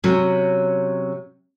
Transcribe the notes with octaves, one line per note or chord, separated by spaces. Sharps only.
C3 F#3 C#4